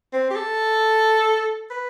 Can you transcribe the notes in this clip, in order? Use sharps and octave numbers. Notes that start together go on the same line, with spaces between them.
C4
G4
A4
B4